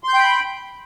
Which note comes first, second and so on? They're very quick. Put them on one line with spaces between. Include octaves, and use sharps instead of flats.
C6 G6 G5 B5